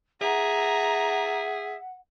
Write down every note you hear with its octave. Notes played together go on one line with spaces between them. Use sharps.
G#4 E5 F#5 A#5